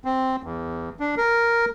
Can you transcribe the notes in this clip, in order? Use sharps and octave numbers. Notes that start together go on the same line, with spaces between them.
C4
E2
D4
A#4